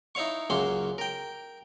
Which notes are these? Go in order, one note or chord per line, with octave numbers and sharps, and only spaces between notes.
D#4 E4 C#5 F5 C#6
C#2 F#2 A#3 C#4 C#5 C6
A#4 G5